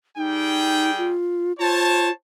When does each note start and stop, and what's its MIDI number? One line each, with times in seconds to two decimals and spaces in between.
0.17 1.16 55
0.17 0.91 63
0.17 1.16 68
0.17 1.16 79
0.98 1.53 65
1.59 2.11 65
1.59 2.10 72
1.59 2.10 73
1.59 2.10 81